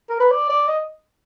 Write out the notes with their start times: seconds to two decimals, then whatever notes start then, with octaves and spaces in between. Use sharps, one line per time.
0.09 A#4
0.20 B4
0.31 D5
0.49 D5
0.68 D#5